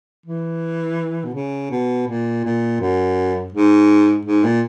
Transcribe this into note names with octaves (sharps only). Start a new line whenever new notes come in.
E3
B2
C#3
B2
A#2
A#2
F#2
G#2
G#2
A#2